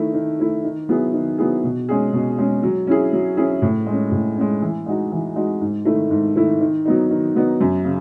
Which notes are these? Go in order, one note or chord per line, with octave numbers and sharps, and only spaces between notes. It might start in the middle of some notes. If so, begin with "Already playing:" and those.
Already playing: D#3 A3 E4
D#3
A3 E4
D#3
F#3 B3 E4 G#4
D#3
F#3 B3 E4 G#4
B2
G#3 C#4 G#4
B2
G#3 C#4 G#4
F#3
C#4 E4 G#4
F#3
C#4 E4 G#4
A2
G#3 C#4
A2
G#3 C#4
E3
G#3 D#4 F#4
E3
G#3 D#4 F#4
G#2
D#3 A3 E4
G#2
D#3 A3 E4
D#3
F#3 B3 D#4
D#3
F#3 B3 D#4
F#2
C#3